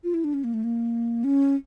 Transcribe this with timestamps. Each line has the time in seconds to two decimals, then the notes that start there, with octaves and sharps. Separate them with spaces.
0.04 F4
0.14 E4
0.24 D4
0.34 C#4
0.44 A#3
0.54 A3
0.64 A#3
1.24 C#4